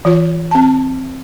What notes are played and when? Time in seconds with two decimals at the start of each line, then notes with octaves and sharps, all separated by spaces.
0.05 E3 F4 C#5
0.51 C4 A5